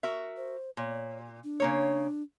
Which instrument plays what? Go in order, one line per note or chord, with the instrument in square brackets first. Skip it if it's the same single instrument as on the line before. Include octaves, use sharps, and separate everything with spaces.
[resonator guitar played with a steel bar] F#4 A#4 E5
[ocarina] C5
[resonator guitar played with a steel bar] A#2 [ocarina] C#5
[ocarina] D4
[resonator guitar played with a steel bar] C#3 A#3 C#5